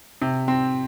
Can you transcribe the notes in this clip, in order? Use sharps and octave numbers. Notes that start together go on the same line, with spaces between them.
C3
C4